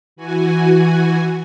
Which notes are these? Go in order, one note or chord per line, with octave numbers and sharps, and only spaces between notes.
E3 F#4 G#5